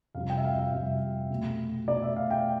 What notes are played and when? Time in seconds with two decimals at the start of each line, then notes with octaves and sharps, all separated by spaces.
0.15 F2 C3 G3 F5
0.30 G5
0.37 E5
0.44 F5
0.58 E5
0.73 F2 C3 G3
1.30 B2 A3
1.87 B2 A3 D5
2.02 E5
2.16 F5
2.30 G5